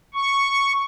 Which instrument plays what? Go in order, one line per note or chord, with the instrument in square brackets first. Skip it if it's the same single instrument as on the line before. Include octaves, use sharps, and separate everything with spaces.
[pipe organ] C#6